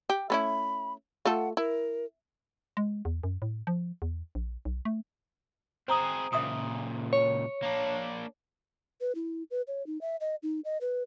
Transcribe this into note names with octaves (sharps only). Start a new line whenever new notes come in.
G4
A3 C#4 E4 B5
A3 F4 A4 F#5
E4 A#4
G#3
E2
F#2
A2
F3
E2
A#1
B1
A3
C4 G#4 C5 A#5 D#6
C#2 A#2 E5 C6 D#6
C#5
A#3 D4
B4
E4
B4
C#5
D#4
E5
D#5
D#4
D#5
B4